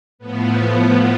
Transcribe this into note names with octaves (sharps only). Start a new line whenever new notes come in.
A2 F3 B3